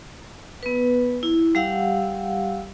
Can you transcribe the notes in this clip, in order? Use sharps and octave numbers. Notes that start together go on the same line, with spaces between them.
B3 B4
E4
G3 G4 F5 F#5 E6